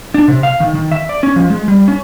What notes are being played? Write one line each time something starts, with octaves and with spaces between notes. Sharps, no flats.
D4
C3
F5
D#3
D#3
E5
D5
C#4
F3
G#3
G3
C#4